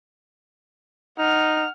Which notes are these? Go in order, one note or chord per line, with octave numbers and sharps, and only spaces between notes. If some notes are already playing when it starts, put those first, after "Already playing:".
D#4 F#5 F6